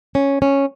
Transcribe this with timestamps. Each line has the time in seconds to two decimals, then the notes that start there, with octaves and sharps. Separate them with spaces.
0.15 C#4
0.42 C#4